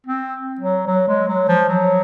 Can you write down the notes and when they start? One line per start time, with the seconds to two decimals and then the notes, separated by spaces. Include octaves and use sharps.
0.07 C4
0.61 F#3
0.87 F#3
1.08 G#3
1.28 F#3
1.48 F3
1.69 F#3